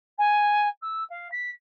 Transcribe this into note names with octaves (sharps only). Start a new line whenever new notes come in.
G#5
E6
F5
B6